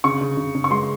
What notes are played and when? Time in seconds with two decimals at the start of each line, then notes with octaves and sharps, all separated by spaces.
0.04 C#3 C#6
0.21 C#3
0.37 C#3
0.55 C#3
0.64 C#6
0.71 G#3 C6